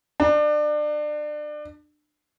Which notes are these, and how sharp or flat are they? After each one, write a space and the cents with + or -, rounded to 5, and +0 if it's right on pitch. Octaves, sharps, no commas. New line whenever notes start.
D4 +30